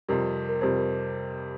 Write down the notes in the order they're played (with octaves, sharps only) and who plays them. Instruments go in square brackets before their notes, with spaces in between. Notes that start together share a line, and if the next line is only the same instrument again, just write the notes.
[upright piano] F2 C3 G3 [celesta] A#4
[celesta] A#4
[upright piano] F2 C3 G3 [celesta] C5
[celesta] A#4